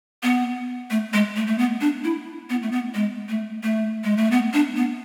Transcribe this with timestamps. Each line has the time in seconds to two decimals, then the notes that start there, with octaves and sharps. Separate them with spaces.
0.23 B3
0.91 A3
1.14 G#3
1.36 A3
1.47 A3
1.58 B3
1.81 D4
2.04 E4
2.50 B3
2.62 A3
2.71 B3
2.95 G#3
3.29 A3
3.63 A3
4.04 G#3
4.17 A3
4.31 B3
4.54 D4
4.77 B3